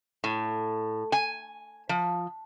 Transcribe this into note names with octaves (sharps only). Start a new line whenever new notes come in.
A2
G#5
F3